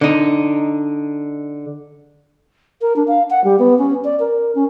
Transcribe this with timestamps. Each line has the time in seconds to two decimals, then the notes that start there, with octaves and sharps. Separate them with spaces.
0.01 D3 D#4
2.81 A#4
2.96 D4
3.08 F5
3.30 F#5
3.44 G3
3.59 B3
3.79 C#4
4.05 D5
4.20 A#4
4.55 C#4